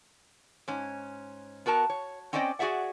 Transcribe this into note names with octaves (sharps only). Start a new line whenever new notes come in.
G#2 C#4
B3 F#4 A#4 A5
C#5
C4 C#4 C5 D5 D#5 G5
F#4 G#4 D5 E5 F#5